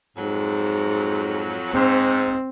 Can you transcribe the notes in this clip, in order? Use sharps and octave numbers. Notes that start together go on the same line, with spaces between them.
F2 G#2 F#3
G#2 C4